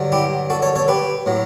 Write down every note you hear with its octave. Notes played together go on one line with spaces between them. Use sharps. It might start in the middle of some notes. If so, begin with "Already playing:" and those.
Already playing: G2 D3 F#3
E4 G4
F#4 A4
A4 C#5
A4 C#5
G4 B4
A2 F#3